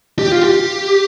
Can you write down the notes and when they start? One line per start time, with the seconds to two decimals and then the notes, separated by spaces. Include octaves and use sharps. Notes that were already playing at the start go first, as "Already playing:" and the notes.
0.19 G4
0.32 F4
0.44 G4